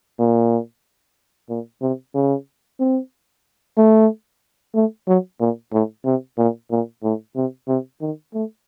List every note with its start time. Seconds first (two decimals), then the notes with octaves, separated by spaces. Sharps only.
0.19 A#2
1.49 A#2
1.82 C3
2.15 C#3
2.80 C4
3.77 A3
4.75 A3
5.07 F#3
5.40 A#2
5.72 A2
6.05 C3
6.38 A#2
6.71 A#2
7.03 A2
7.36 C3
7.68 C3
8.01 D#3
8.34 A3